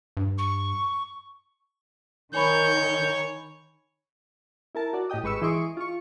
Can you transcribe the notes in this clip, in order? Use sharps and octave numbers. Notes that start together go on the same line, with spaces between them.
G2
C#6
D#3 C#5 G#5 B5 C#6 G6
E4 A#4 A5
F#4 D5
A2 G4 D#5 G5 D#6
G#1 G#3 B4 C#6 E6
E3 G#4 D#5 C6 C#6 D7
F4 C#6